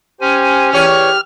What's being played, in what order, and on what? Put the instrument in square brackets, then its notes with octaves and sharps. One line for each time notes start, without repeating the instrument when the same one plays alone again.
[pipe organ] C#4 G#5 [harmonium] G4 C5
[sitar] E2 C#5 [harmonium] G4 [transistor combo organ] F6